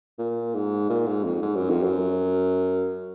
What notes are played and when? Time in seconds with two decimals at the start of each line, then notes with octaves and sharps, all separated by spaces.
0.19 A#2
0.55 G#2
0.90 A#2
1.07 G#2
1.24 F2
1.42 G#2
1.56 F#2
1.70 F2
1.83 F#2